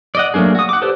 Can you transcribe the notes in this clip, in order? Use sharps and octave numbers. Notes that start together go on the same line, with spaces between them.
D5 D#5 F#5
F#3 A3 A#3 D4 G#4
F#4 D#6
F#5 D6
G4 A4 B4 C5 D5